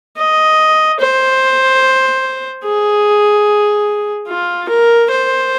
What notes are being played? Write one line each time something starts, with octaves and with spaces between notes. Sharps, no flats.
D#5
C5
G#4
F4
A#4
C5